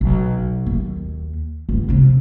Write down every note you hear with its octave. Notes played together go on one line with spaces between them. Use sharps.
B1
D#2
G1
C3 F3